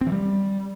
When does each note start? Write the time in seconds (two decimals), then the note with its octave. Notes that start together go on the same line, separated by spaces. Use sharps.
0.01 C4
0.07 E3
0.12 G3